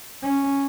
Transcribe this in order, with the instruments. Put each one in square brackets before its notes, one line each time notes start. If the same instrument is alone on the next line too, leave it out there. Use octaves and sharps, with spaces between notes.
[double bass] C#4